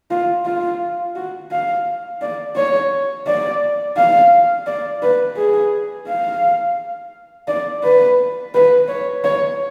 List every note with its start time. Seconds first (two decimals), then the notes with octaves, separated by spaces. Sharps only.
0.11 F4
0.45 F4
1.16 F#4
1.51 F5
2.22 D5
2.56 C#5
3.27 D5
3.97 F5
4.67 D5
5.03 B4
5.37 G#4
6.08 F5
7.48 D5
7.83 B4
8.54 B4
8.88 C#5
9.24 C#5